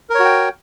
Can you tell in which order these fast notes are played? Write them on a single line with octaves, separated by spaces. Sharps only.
A#4 C#5 F#4 G5